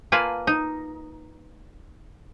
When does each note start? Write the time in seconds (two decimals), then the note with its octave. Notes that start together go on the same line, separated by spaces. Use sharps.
0.12 A#3 F4 B4 G#5 A5
0.47 D#4